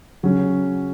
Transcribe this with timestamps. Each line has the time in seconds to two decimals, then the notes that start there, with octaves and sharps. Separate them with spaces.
0.23 C#3 F#3 C#4 G#4